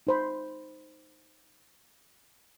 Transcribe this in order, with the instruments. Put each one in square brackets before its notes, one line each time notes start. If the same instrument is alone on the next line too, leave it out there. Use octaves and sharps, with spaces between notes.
[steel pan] D#4 C5 B5